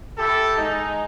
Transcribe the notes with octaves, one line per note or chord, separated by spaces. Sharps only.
E4 G4 A4
G#3 D#4